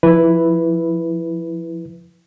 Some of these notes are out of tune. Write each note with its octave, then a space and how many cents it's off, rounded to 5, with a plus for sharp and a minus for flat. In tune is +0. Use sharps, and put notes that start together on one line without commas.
F3 +0 E4 +0 B4 +0